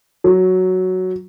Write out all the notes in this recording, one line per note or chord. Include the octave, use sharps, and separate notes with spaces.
F#3